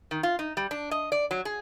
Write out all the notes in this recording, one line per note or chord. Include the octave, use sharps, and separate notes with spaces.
D#3
F4
D#4
G3
D4
D#5
D5
F#3
G#4